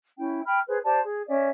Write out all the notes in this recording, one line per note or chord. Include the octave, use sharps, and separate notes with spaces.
C#4 E4 G5
G5 B5 F6
G#4 B4 C5
G4 C5 D5 A5
G#4
C#4 C#5 D5 E5